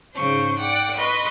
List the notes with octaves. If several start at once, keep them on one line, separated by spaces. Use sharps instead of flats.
G#2 C#3 C5 C#6
D5 F#5 G5
B4 D#5 C6 C#6